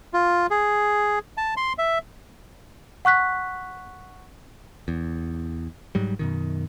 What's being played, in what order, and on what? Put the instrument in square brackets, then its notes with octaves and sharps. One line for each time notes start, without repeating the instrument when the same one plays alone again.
[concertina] F4
G#4
A5
C6
E5
[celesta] F#5 C#6 F#6 B6
[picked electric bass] E2
G#2 F#3 G3
F#2 B2 D#3